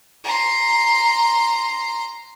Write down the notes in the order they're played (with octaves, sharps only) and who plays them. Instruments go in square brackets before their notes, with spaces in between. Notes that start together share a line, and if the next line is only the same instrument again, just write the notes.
[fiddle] A#5 C6